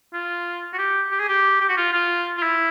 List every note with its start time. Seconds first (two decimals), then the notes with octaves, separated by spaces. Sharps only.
0.13 F4
0.73 F#4
0.78 G4
1.11 G4
1.20 G#4
1.28 G4
1.60 G4
1.69 F#4
1.77 F4
1.93 F4
2.37 F4
2.43 E4